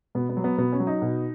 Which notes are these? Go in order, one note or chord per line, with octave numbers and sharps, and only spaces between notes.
B2 B3
B3
F#3
B3
B2 B3
C#4
F#3
D#4
B2